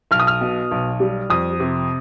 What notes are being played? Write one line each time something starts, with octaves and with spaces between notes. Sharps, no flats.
B1 F6
D#6
F6
B2
B1
G3
F2 D#6
C3